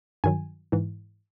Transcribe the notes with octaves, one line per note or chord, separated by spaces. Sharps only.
G2 D#3 F#3 G#5
G#2 E3